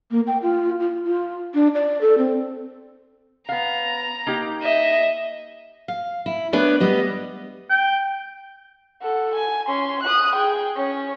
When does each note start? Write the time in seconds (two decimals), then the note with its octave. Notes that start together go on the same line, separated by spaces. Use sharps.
0.11 A#3
0.27 G5
0.42 F4
0.80 F4
1.04 F4
1.54 D4
1.75 D5
2.01 A4
2.18 C4
3.49 B3 F5 A#5
4.27 A#3 D#4 G4
4.63 D#5 E5
5.88 F5
6.26 E4
6.53 A3 B3 D4 B4 C#5
6.80 G3 B3 D#5
7.70 G5
9.02 A4 F#5
9.36 G#5
9.68 C#4 C6
10.03 D#6 F#6
10.35 G#4 G5
10.76 C#4 C#5